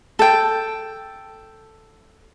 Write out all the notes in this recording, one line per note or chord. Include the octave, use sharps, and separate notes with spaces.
A4 G5